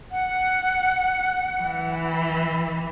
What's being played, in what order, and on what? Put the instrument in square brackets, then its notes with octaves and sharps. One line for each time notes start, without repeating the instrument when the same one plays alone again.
[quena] F#5
[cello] E3